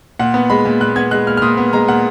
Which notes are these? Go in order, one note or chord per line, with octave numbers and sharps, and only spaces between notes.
A#2 F#5
B3
G#3 B5
A#2
A#2 F#6
B3 G#6
G#3 F#6
A#2 F6
F6
A#2 D#6
B3
G#3 A#5
A#2 F#5